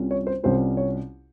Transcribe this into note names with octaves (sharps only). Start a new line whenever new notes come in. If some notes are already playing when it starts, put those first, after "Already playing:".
Already playing: C2 C3 G3 C#4 F4
C#5
C5
C2 C3 G3 C#4 F4 C5
C#5